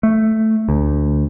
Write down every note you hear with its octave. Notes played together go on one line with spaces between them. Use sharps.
A3
D2